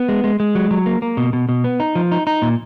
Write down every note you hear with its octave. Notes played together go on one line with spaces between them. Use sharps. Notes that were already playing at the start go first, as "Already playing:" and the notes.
Already playing: B3
G#3
G#3
G#3
F#3
F#3
A#3
A#3
B2
B2
B2
B3
D#4
F3
D#4
D#4
A#2